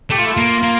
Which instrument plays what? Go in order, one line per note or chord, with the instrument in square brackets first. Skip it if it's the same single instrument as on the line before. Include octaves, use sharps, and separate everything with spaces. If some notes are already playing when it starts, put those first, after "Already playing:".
[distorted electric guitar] A3 [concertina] G4
[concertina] F4
E4
[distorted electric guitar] A#3 [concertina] F4
[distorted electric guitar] A#3